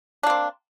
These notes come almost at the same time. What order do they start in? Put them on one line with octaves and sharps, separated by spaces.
D4 A#3 C4